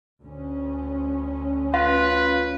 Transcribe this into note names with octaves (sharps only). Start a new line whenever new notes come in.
D2 C#4
F4 B4 F5